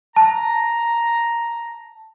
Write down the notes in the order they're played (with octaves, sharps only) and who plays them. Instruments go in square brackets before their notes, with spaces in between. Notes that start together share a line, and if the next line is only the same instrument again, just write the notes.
[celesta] A5 [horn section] A#5